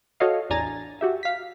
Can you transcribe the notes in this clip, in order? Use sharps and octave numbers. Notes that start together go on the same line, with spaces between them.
F#4 A4 C#5 D#5 F5
A1 E2 D4 G#5 A#5 A6
F#4 G4 E5
F5 B6